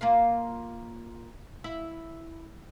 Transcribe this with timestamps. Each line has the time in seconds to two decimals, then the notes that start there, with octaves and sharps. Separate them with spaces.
0.01 A#3 F4 F5
1.64 E4